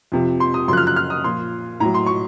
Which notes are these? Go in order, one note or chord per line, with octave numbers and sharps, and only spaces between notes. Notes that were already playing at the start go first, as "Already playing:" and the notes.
F2 C3 F3
C6
D#6
F#2 C#3 F3 C6 F#6
F6
F#6
F6
D#6
A#2 F3 C6
A2 F#3 A#5
C6
C#6